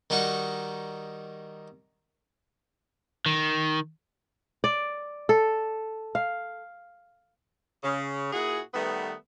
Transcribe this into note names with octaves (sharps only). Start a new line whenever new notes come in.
D#3 G3 D#4 F#4 C#6
D#3
D5
A4
F5
C#3
A#2 E4 F#4 G#4
D#3 G3 A3 B3